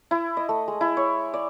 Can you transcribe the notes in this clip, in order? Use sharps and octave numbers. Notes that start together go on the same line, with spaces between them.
E4
D#5
A3
G#3
E4
C#5
D5